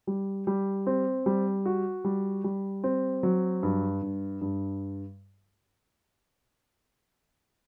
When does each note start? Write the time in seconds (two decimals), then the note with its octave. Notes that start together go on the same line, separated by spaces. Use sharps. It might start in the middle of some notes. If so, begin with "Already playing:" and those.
0.07 G3
0.47 G3
0.87 C4
1.26 G3
1.66 F#4
2.05 G3
2.44 G3
2.84 C4
3.23 F#3
3.63 G2
4.02 G2
4.41 G2